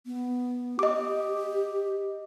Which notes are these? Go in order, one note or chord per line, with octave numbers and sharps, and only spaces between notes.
B3
G4 D#5 D6